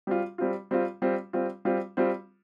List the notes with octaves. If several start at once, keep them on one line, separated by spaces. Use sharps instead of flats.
G3 C4 F4
G3 C4 F4
G3 C4 F4
G3 C4 F4
G3 C4 F4
G3 C4 F4
G3 C4 F4